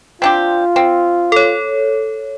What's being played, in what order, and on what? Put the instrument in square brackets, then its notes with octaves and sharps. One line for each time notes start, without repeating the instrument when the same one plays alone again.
[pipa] C4 D4 G4 [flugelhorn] F4
[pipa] C4
[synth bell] A4 C#5